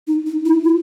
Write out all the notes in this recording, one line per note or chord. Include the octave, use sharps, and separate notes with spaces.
D#4
D#4
E4
F4